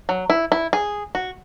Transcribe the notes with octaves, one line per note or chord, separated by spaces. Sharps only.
F#3
E4
E4
G#4
F#4